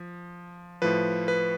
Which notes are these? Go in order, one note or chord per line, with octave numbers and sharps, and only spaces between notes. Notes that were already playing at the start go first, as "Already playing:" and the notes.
Already playing: F3
A2 F3 B4
B4